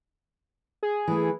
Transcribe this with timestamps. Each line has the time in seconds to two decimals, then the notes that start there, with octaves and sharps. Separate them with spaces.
0.83 G#4
1.08 E3 A3